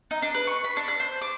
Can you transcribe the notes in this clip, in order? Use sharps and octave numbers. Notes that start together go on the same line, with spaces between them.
D#4
D4
B4
C#6
B5
D4
F#6
C5
D6